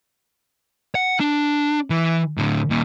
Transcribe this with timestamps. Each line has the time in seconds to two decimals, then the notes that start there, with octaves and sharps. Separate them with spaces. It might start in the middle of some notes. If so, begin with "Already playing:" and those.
0.95 F#5
1.20 D4
1.90 E3
2.38 A2 D3
2.70 D#2 A#2